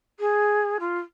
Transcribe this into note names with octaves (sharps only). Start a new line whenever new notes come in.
G#4
F4